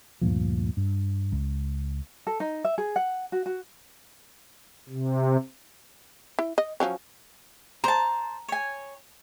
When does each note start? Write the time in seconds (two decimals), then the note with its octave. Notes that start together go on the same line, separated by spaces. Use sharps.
0.21 D2 G2 A#2 F3
0.77 G2
1.32 C#2
2.27 A4
2.40 D#4
2.65 E5
2.78 G#4
2.96 F#5
3.32 F#4
3.46 F#4
4.89 C3
6.39 E4
6.58 D#5
6.80 F3 F#3 C#4
7.84 C5 A5 A#5
8.48 C#5 G#5